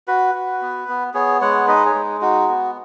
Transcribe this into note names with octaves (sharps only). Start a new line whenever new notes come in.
F#4 B4
F#4
B3
B3
B3 G#4 C#5
G#3 C#5 F#5
D#4 B4 D#5
G#4 C#5
G#3
D#4 F#4
B3